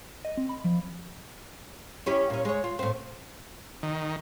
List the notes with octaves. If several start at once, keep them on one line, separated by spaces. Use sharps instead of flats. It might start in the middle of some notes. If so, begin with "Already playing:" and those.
D#5
C4
B5
F3
C#4 E4 G4
A#2 C#4
G#3 C#5
F4
A2 C4
D#3